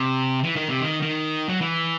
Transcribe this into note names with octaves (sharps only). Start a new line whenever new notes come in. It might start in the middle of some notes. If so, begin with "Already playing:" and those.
Already playing: C3
E3
D#3
C3
D#3
D#3
F#3
E3